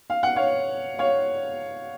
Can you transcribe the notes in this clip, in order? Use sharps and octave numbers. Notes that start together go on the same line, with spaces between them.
F5
F#5
C#5 F5
C#5 F5